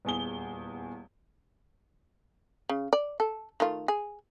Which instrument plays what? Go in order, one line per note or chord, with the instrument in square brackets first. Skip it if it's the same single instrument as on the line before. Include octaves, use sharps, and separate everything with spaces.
[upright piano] D#1 E2 G#4 G7
[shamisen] C#3
D5
A4
D#3 A3 F4
G#4